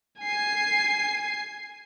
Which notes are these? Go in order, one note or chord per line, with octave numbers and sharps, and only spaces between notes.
G#5 C7